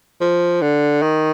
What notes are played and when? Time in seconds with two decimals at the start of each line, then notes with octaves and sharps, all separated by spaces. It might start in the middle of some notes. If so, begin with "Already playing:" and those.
0.21 F3
0.62 D3
1.02 D#3